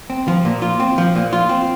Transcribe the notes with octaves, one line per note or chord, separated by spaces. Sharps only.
C4
F3
A#2
F4
C4
F3
A#2
F4
C4